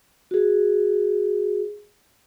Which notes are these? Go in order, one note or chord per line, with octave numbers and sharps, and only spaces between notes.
F#4 G#4